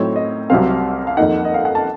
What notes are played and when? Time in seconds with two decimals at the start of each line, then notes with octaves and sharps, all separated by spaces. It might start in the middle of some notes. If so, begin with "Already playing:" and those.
Already playing: A2 F#3 C4 D#4 C#5
0.16 D#5
0.50 C2 C3 F#3 C4 F5
1.07 F5
1.17 F2 D#3 A#3 D#4 F#5
1.45 D#5
1.54 F5
1.65 F#5
1.75 A5